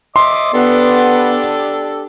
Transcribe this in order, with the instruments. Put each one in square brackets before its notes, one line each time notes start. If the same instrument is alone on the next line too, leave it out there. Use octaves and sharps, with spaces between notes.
[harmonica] D#5 E5 D6 [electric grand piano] C6
[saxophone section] B3 [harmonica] D4 G4 A4